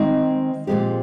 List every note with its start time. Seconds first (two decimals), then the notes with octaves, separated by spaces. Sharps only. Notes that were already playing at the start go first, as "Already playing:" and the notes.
Already playing: D#3 G#3 C4 D#5
0.67 A#2 F3 G#3 C4 G4